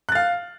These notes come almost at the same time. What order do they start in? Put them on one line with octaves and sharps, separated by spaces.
F#6 A6 F5